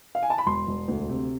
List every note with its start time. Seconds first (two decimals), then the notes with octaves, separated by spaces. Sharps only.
0.15 F5
0.23 G#5
0.30 A5
0.38 B5
0.46 E1 C6
0.67 E1
0.88 D2
1.09 C3